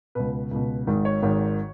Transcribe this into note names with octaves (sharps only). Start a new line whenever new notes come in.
C#2 B2 B4
C#2 B2
G#1 G#2 D#3
C#5
G#1 G#2 D#3